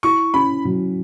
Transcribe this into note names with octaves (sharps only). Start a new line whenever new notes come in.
E4 C#6
C#4 B5
F#3